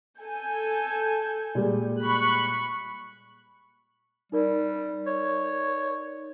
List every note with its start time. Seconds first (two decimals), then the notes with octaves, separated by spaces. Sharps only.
0.21 A4 G#5 G6
1.55 A#2 G3 G#3
2.03 B5 C#6 F#6
4.32 G3 D#4 A#4 D5
5.06 C#5